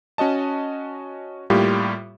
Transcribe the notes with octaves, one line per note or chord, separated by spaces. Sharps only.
C#4 F#4 D#5 A5
A2 G3 A#3 F4 G4